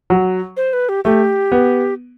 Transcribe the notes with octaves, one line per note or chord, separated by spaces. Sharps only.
F#3
C5
B4
G4
A3 G4
B3